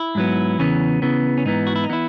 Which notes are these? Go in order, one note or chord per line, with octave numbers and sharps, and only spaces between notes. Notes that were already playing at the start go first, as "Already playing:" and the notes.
Already playing: E4
G#2 F#3 B3
E2 C#3 E3 B3 C#4
E2 C#3 E3 B3
C#4
G#2 E3 B3 D#4
F#4
E4
D#4
E3 B3 E4